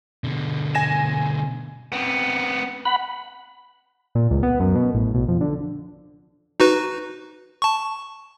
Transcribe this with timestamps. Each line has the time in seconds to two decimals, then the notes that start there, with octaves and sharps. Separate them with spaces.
0.24 B2 D3
0.75 G#5 A#6 E7
1.93 B3 C4
2.85 F#5 B5
4.15 A#2
4.31 C#2
4.43 B3
4.60 F#2
4.76 B2
4.94 A1
5.14 B1
5.28 F2
5.41 D3
6.60 D#4 F#4 B4
7.62 A5 C#6